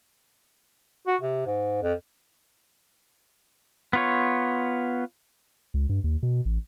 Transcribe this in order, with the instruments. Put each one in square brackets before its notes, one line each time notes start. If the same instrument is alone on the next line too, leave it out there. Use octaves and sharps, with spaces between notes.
[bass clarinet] F#4
C3
G#2
F2
[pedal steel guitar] B3 F4 C#5
[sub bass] C#2
G2
D#2
B2
A1